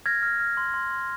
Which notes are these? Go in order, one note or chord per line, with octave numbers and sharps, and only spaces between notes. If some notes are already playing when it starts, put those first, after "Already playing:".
F6 G#6 A#6
F6
F6
C6
C6
C6